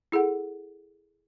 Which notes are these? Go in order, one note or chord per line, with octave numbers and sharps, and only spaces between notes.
E4 G#4 A4 F#5